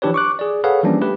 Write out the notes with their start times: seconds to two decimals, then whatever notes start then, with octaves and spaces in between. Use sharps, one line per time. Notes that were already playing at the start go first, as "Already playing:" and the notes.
0.02 E3 F3 D4 G4 B4 C#5
0.14 C#6 D6 F#6
0.39 G#4 D5
0.64 G#4 A4 B4 C#5 F5 F#5
0.83 E3 F3 G3 A#3 C#4 D4
1.01 A3 G4 B4